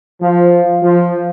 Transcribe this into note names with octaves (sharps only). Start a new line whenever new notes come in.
F3
F3